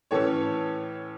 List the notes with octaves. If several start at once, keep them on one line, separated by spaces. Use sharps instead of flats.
A2 E3 C#4 A4 C#5